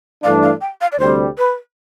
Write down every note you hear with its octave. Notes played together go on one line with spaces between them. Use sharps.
G2 E3 A3 D4 F5
F5
G5
F5
D5
D2 C3 G3 C5
B4